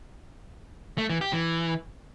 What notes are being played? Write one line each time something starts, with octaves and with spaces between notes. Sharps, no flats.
A3
E3
G4
E3